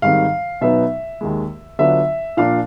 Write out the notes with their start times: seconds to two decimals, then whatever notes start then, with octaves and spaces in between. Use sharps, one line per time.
0.02 G#2 D#3 G3 C4 F5
0.61 B2 F#3 B3 D#4 E5
1.21 D#2 D#3 G#3
1.79 D3 F#3 B3 D4 F4 E5
2.37 A#2 F3 A#3 D4 F4 F5